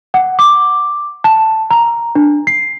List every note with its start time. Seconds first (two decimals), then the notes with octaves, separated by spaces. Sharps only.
0.14 F#5
0.39 D6
1.24 A5
1.71 A#5
2.15 D4
2.47 C7